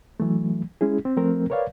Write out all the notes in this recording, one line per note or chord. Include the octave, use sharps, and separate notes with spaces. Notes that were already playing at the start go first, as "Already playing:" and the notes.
E3 F#3 A3
G#3 C#4 E4 G#4
C4
F3 A3 C4 A#4
A#4 B4 C#5 D5 F5